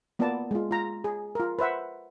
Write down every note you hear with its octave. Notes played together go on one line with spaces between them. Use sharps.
A#3 B3 F4 B4 D5 A5
G#3 F4
F4 A#5
G#4
F4 A#4
B4 C5 E5 F#5